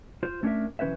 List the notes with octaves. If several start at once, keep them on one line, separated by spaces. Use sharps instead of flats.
F4 C5
A3 C#4 D4 G4 A#4 E5
B1 E3 C#4 B4 C5 E5